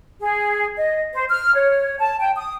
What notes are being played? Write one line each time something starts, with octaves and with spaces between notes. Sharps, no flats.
G#4
D#5
C5
F6
C#5
A5
G5
D#6